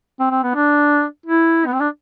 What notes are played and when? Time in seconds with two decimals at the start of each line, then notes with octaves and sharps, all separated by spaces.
0.20 C4
0.31 C4
0.43 B3
0.55 D4
1.26 E4
1.66 B3
1.73 C4
1.80 D4